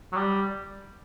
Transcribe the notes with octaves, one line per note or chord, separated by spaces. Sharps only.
F#3
G3